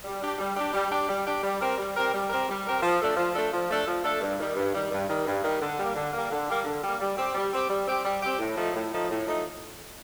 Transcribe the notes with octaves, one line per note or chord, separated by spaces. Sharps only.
G3
D4 G4
G3
D4 G4
G3
D4 G4
G3
D4 G4
G3
C4 G4 A#4
G3
C4 G4 A#4
G3
C4 G4 A#4
G3
C4 G4 A#4
F3
A3 D4 A4
F3
A3 D4 A4
F3
A3 D4 A4
F3
A3 D4 A4
G2
D#3 G3
G2
D#3 G3
G2
D#3 G3
G2
D#3 G3
D3
G3 A#3
D3
G3 A#3
D3
G3 A#3
D3
G3
A#3
G3
C4 G4
G3
C4 G4
G3
C4 G4
G3
C4 G4
A2
F3 A3 D#4
A2
F3 A3 D#4
A2
F3 A3 D#4